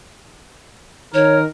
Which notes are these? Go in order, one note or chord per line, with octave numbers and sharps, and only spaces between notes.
D#3 A#4 C#5